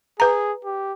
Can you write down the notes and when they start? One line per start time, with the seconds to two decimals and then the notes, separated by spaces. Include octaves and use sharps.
0.20 G#4 B4 A#5
0.65 G4